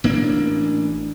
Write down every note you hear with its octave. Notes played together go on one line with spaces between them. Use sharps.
A1 A#3 D4